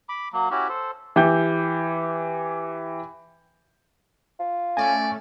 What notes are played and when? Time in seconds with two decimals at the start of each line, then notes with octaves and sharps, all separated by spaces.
0.09 B5 D6
0.33 F#3 A#3
0.51 C#4 E4 F#4 G4
0.69 A4 C5
1.16 E3 G4 G6
4.40 F4
4.77 A3 C#4 D5 G#5